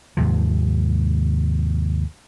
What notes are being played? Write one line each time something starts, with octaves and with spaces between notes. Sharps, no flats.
D#2 G#2 C3 F3